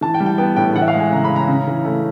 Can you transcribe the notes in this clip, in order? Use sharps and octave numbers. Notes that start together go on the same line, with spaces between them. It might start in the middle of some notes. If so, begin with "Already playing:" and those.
E3 A5
G5
G3
G5
B3 G5
A2 G5
E3 F#5
E5
F5
G#3
G#5
C#3 A#5
B5
C#3
A#5
C#3
E3
A3